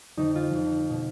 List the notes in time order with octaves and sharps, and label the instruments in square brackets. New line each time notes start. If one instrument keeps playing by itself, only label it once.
[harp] F2 D3 F3 D#4
F4
F2 D3 F3
B2